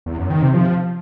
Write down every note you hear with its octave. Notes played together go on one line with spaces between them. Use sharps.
E2
F#2
D#3
C3
F3